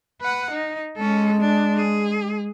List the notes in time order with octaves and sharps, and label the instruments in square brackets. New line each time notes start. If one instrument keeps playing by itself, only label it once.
[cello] B4 F#5
D#4
[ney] G#3 [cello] C#4 A4
[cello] D4
G#4